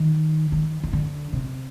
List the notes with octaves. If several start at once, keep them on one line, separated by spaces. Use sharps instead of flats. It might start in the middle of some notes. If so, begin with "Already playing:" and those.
Already playing: D#3
D#3
D#3
D3
C3